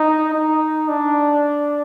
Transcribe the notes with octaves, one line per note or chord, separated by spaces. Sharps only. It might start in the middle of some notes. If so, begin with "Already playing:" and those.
Already playing: D#4
D#4
D4